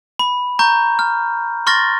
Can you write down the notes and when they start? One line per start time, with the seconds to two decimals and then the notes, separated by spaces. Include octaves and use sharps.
0.19 B5
0.59 A#5 C#6 G6
0.99 F6
1.67 C6 C#6 F6 A6 A#6